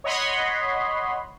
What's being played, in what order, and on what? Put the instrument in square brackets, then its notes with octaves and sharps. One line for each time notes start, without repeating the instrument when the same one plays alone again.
[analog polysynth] C#5 D#5 F#5 B5 C6